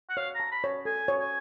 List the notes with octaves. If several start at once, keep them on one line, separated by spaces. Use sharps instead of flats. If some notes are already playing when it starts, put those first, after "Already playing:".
F#5
C#5 F5
A5 A#5
B5
C#5
A4 G#5
C#5
G#5